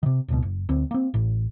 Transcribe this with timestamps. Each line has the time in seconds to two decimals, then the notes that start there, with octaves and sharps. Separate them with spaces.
0.03 C3 D#3
0.28 D1 C#2 B2
0.42 F#1
0.69 D2 C4
0.91 A#3 C4
1.14 A1